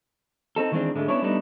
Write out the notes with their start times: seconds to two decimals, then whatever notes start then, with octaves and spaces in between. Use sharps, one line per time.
0.56 C4 D#4 A4
0.72 D#3 E3 G#3 B3 C4 D4
0.95 G#2 D3 G#3 A3
1.08 B3 C#4 D4 E4 C#5
1.22 G3 A3 B3 D4 D#4